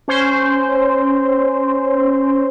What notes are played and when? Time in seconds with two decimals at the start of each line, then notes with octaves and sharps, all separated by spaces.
0.08 C#4 C5